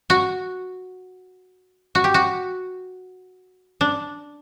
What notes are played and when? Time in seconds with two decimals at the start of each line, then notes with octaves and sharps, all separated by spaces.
0.10 F#4
1.95 F#4
2.04 G4
2.14 F#4
3.81 D4